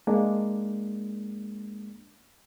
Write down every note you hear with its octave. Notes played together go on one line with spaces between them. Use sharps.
G#3 A#3 D4